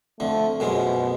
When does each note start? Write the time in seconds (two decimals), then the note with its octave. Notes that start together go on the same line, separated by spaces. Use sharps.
0.20 F2 D3 A3
0.60 F#2 B2 F3 G#3